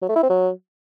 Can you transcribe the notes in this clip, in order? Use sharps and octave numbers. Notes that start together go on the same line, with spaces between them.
F#3
A3
E4
C4
F#3